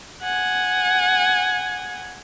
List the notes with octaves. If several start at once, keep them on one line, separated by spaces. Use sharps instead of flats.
F#5 G#5